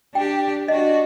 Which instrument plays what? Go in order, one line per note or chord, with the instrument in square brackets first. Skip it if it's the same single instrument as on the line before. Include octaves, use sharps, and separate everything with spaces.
[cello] D4 G4 [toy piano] G5
[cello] D4 F#4 [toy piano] D#5